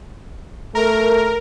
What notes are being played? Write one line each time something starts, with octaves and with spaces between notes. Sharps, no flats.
A3 A#4